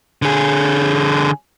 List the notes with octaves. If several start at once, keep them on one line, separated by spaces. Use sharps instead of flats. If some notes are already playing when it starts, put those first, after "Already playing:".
D3 G#4